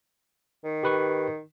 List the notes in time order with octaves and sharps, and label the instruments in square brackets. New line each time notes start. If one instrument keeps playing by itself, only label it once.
[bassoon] D#3
[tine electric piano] G4 B4 C#6